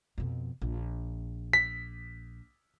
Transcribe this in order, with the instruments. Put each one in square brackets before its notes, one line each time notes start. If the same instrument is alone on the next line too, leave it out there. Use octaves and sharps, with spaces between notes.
[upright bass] F2 B2
A#1
[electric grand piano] B6